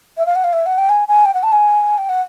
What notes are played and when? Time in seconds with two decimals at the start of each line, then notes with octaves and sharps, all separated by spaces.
0.17 E5
0.26 F5
0.35 F#5
0.44 F5
0.53 E5
0.66 F#5
0.78 G5
0.89 G#5
1.08 G#5
1.25 G5
1.34 F#5
1.43 A5
1.52 G#5
1.98 G5
2.09 F#5